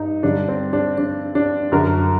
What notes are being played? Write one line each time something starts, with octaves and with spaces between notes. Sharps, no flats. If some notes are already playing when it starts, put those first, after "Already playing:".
Already playing: G2 D#4
G2 D3 D4
C4
D4
D4
D4
F#2 D3 A#4